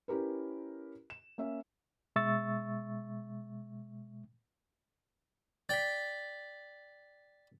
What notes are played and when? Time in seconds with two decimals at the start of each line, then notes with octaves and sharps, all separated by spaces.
0.08 C#4 E4 G4 A#4 B4
1.10 E7
1.38 A#3 C#4 E5
2.16 B2 G#3 E5 C#6 E6 A6
5.69 D5 G5 A6 B6